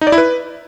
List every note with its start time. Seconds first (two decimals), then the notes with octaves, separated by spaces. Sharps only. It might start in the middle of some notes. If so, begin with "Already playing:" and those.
0.01 D#4
0.07 D5
0.12 E4
0.18 B4